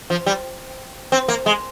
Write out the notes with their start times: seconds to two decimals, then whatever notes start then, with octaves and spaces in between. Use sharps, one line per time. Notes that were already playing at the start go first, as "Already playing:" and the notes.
0.10 F3
0.26 G3
1.12 C4
1.28 A#3
1.46 G#3